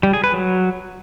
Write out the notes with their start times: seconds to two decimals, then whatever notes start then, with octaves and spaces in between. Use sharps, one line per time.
0.03 G3
0.13 G#4
0.24 B4
0.34 F#3